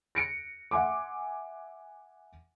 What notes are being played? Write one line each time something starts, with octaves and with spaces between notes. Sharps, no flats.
A#6 C#7 D7
E5 F#5 G#5 C6 D6